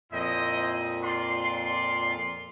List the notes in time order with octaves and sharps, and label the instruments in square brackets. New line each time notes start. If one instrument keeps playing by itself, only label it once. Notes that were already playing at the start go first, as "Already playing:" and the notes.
[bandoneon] F2 A#2 [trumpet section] E4 C5 D#5
[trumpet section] F4 D5 C6